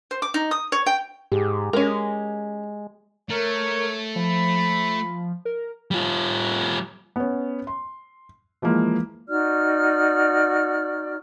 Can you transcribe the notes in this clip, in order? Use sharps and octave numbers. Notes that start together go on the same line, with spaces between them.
C5
D6
D#4
D#6
C#5
G5
G#2 G4 G#4
G#3 C#4 A#4
A3 A#4 C#5
F3 B5
A#4
G3 F4
B3 C#4
C6
E3 F3 G#3 A#3
D#4 F#4 D5 F6